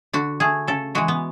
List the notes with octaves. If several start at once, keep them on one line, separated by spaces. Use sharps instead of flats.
D3 F#4
A3 G#4
C#3 A4
E3 G#3 F#4
B3